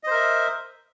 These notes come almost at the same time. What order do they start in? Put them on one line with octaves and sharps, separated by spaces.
D#5 C5 A#4 E5